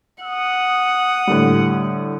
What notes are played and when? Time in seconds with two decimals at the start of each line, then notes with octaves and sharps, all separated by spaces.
0.23 F#5 D#6
1.27 A2 D3 G3